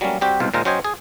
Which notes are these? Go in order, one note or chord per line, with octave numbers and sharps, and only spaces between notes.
F#3 G3 A3 A#3 C#4
G3 C4 F#4 G4
C2 G#2 B2 C5 F5
A#2 D#3 G#3 C5 F5 A#5
F#3 C#4 C5 D#5 G5 G#5
G#4